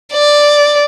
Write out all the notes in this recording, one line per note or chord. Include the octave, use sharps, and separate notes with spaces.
D5